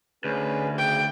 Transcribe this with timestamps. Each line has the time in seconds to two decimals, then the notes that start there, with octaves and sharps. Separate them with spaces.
0.24 D2 C#4 G#4 B4
0.78 C#3 G5